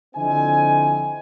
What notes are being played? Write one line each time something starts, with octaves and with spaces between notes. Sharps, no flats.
D3 F3 C4 E4 D#5 G#5